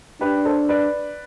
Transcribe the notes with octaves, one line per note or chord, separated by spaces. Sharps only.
D4 G4 B4
A4 C5
B4 D5